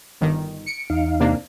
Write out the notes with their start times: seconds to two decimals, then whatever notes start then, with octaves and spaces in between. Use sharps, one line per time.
0.21 G1 D#3
0.66 C#7 D7
0.90 E2 D#4 F5
1.20 C3 A#3 D4